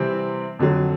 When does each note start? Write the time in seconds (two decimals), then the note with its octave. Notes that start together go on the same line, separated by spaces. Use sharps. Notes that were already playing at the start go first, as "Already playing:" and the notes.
Already playing: C3 E3 G3 C4
0.59 F2 D3 F#3